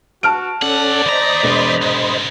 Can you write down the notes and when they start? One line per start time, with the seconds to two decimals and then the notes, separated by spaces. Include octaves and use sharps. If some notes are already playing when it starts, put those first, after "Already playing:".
0.23 F#4 A5 F6 D7
0.62 G2 C#4 A4 D5 F#5
1.06 D#2 C5 D#5 A#5 B5
1.43 E1 E2 F4
1.82 C2 G#2